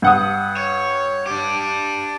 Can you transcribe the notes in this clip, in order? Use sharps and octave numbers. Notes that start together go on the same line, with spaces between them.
G2 F#5 D#6
C#5
D4 G4